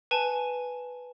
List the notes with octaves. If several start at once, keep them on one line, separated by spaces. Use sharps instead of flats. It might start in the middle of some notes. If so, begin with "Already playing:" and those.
B4 G#5 A5